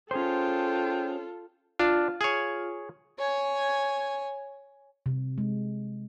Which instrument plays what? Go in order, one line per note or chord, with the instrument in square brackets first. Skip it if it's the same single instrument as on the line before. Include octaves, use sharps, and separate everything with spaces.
[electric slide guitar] C#4 G#4 C5 [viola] F4 A4 [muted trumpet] G5
[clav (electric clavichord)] D4 [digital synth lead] F4
[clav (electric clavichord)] G#4 C#5
[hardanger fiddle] C#5 G#5
[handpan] C3
G#3